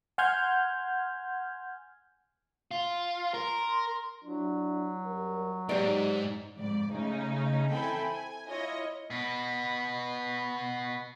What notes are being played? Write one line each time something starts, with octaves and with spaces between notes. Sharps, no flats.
F#5 G#5 C6 F6 G6 G#6
F4
A#4 C6
F#3 D4 E4 F#4
F#2 G3 A#4
G#2 D#4 G4 C5 D5
F2 G#2 D5
C#3 A3 C#4 D#4
C4 E4 A4 G5 G#5 B5
G#5
E4 F4 C#5 D#5
B2 B3